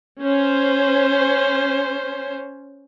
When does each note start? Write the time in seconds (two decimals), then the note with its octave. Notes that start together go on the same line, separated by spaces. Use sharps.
0.20 C#4 C5